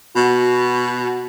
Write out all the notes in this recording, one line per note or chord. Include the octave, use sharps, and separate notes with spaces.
B2 F#4